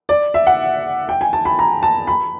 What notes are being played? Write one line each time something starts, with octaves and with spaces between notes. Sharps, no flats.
D5
E5
F#5
G5
G#5
A5
B5
A#5
A5
B5